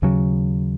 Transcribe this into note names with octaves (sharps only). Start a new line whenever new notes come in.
D#2 C#3 F#3